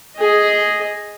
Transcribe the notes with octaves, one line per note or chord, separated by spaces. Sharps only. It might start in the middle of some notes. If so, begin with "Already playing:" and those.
G#4 D#5